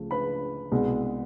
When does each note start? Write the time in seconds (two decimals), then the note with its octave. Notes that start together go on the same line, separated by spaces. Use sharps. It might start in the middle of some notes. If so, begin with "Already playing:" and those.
Already playing: C#2 C#3 F3 A3
0.11 B4 B5
0.72 C2 B2 G#3